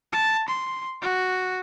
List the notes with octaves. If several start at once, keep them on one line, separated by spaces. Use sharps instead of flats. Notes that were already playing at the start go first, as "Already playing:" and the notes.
A5
C6
F#4